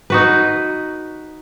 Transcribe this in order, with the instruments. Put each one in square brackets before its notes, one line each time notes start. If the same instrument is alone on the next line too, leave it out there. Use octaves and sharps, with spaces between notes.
[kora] D#4 F#4 B4